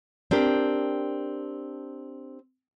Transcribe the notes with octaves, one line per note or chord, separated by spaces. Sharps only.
C4 D4 G4 A#4